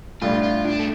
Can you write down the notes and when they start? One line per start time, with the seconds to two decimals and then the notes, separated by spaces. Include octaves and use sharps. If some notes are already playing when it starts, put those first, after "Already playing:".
0.22 A2 G3 D4 F4
0.43 F4
0.65 D4
0.80 A3